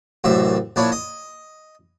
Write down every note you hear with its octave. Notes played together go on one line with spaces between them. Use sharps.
A1 F#2 C3 E5
A#1 D4 E4 C#5
D#5